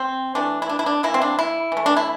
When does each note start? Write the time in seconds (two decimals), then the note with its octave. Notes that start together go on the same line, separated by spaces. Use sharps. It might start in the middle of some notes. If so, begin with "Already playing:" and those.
Already playing: C4
0.35 E3 A3 D4
0.62 E4
0.69 D4
0.79 E4
0.86 D4
1.03 E3 A#3 E4
1.14 C4
1.22 D4
1.39 E4
1.72 E3 A3
1.86 D4
1.97 E4